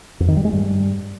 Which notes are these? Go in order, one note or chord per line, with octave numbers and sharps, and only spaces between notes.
F2
D#3
G3
G#3
G2